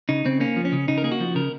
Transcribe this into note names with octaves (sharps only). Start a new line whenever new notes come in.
C#3 D#4
C#3 C4
A#3 C#4
F3
C#4
C#3
C#3 D#4
A#4
A#3 G#4
F#4
F3
C#3 A#4